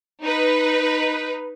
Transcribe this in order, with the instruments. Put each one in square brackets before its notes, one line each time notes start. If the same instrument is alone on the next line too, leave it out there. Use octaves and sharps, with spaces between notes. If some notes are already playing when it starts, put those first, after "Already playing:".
[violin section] D#4 B4